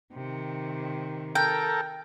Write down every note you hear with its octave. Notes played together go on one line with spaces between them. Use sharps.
C3 D#3
A4 A#4 G5